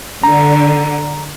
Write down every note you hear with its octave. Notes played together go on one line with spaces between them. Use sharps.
D3 A#5